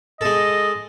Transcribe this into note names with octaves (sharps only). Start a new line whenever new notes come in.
G#3 A4 D#5